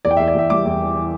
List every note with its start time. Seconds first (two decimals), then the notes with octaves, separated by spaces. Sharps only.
0.05 E2 D5
0.11 G5
0.17 E5
0.20 E2
0.28 D5
0.35 E2 E5
0.50 G3 D6
0.66 E2
0.81 E3
0.96 E3